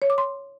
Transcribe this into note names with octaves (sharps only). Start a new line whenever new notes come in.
C#5
D6
C6